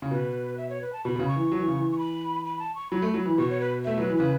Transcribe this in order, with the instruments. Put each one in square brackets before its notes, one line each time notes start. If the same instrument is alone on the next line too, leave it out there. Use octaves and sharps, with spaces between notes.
[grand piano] C#3
[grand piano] B2 [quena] B4
[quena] E5
C#5
B4
A5
[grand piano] B2 [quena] B5
[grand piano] B2
C#3
[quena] C#6
[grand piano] E3
F#3
E3
C#3
E3
[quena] C#6
B5
B5
A5
C#6
[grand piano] F#3 [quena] B5
[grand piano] A3
F#3
E3
[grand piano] B2 [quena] C#6
[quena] C#5
B4
[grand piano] A3 [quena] E5
[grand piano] F#3 [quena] B4
[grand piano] E3
[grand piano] C#3 [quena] B4